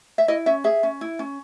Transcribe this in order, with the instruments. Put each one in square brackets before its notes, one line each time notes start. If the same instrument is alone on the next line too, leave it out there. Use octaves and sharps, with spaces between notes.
[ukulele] E5
E4 D#5
C#4 E5
G#4 E5
C#4
E4
C#4